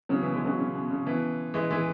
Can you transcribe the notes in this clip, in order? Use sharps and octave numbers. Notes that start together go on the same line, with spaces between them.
C#3 F#3
B2 E3
E3 G#3
C#3 F#3
C#3
B2
C#3
B2 E3
E3 G#3
E3 G#3